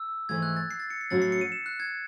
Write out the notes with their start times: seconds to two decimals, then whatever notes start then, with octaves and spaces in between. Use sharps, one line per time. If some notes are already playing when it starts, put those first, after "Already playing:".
Already playing: E6
0.29 G#2 E3 A3 G#6
0.42 F#6
0.56 A6
0.71 C7
0.80 A6
0.90 C#7
1.01 C7
1.10 A2 F#3 C#4 F#4 A6
1.22 C7
1.32 C#7
1.41 D#7
1.52 E7
1.66 F#6
1.80 G#6